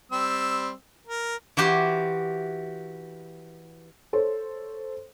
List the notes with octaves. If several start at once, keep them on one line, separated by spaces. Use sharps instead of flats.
G3 C4 E6
A#4
E3 F#4 G4 C5
A4 C5 C#5